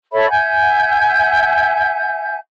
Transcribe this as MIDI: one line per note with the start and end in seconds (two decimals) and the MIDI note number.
0.12 0.29 69
0.12 0.29 73
0.12 0.29 76
0.12 0.29 83
0.30 2.37 76
0.30 2.37 78
0.30 2.37 80
0.30 2.37 91